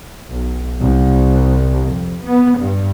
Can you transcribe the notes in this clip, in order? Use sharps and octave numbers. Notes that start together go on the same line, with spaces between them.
B1
C2
F2
B3
G2